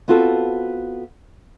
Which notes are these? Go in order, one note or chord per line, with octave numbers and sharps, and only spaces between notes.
B3 C4 F4 F#4 A4